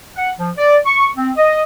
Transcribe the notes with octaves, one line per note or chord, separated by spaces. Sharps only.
F#5
F3
D5
C#6
C4
D#5